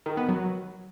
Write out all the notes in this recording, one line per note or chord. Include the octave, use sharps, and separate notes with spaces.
D#3
B3
F#3